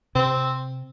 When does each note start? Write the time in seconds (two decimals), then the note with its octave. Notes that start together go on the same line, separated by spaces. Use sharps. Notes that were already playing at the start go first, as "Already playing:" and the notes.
0.15 C3 C4